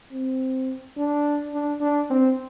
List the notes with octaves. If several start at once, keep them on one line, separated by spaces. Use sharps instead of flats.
C4
D4
D4
D4
C4